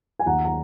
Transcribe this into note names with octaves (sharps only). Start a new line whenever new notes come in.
G#5
D#2 F#5 A#5
A#5